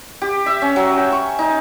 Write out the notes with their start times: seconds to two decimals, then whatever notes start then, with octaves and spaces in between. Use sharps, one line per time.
0.22 G4
0.46 E5
0.62 C#4
0.76 F#3
0.98 G5
1.12 C#6
1.39 D#4